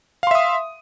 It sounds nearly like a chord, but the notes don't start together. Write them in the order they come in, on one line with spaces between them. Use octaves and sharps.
F5 C6 E5 D#6